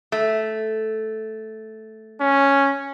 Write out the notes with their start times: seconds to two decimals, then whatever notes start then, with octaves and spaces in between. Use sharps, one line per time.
0.12 A3
2.21 C#4